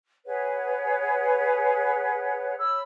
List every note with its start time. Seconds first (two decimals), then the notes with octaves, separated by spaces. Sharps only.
0.26 G#4 B4 C#5 F#5
2.57 C#5 B5 E6